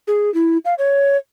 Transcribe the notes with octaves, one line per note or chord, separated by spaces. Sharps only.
G#4
E4
F5
C#5